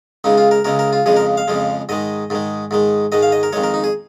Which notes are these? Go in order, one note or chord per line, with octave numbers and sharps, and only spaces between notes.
C#2 C#3 G#3 D#4
F4
A#4
C#2 C#3 G#3 A#4
A#4
F4
F2 C#3 F3 G#3 G#4
A#4
F5
F2 C#3 F3 G#3
G#2 D#3 G#3 D#5
G#2 D#3 G#3
G#2 D#3 G#3
G#2 D#3 G#3 D#5
F5
D#5
A#4
F2 D#3 G#3 C#5
A#4
D#4
G#4